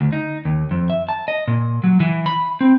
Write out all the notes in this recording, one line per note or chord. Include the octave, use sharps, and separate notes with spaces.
D2
D#4
D#2
F2
E5
A5
D#5
A#2
F#3
E3
B5
C4